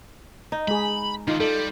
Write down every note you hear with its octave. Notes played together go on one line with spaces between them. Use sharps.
D#4
G#3 G#4 B5
D3 D#3 D#4 F4
G3 A4